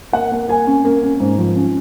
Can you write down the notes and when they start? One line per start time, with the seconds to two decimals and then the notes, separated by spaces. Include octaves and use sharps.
0.13 A#3 F#5
0.32 A#3
0.48 A#3 G#5
0.67 C#4
0.85 A#3
1.03 C#4
1.20 G#2
1.38 F3
1.56 C#4